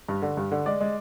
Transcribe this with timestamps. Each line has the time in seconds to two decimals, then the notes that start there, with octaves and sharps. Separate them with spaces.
0.09 G2
0.22 D3
0.37 G2
0.52 D3
0.66 G#3 D5
0.81 G#3